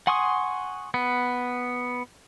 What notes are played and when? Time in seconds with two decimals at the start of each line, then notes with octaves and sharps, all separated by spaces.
0.07 F#5 G#5 C6 C#6 D#6
0.94 B3